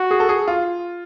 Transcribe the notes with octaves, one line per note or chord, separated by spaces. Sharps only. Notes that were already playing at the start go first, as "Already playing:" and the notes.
Already playing: F#4
G#4
A4
G#4
F4